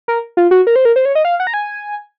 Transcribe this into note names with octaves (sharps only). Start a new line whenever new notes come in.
A#4
F4
F#4
A#4
C5
A#4
C5
C#5
D#5
F5
F#5
A#5
G#5